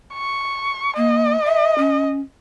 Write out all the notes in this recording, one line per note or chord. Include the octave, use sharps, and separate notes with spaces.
C#6
A#3 D#5
E5
C#4